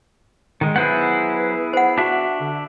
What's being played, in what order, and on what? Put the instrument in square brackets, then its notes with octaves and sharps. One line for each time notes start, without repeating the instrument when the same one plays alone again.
[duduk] D3 [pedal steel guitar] D#3 G#3
[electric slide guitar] F#3 C5 F#5 [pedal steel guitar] B3 E4 G#4 [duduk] B4
[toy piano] C5 F#5
[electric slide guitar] D4 E5 [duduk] F#4
[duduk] D3